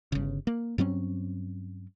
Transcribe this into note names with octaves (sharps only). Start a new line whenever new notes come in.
G1 C#3
A#3
G2 F#3 C4 C#4